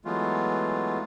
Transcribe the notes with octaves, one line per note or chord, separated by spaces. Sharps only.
E3 F#3 G#3 A3 B3 F4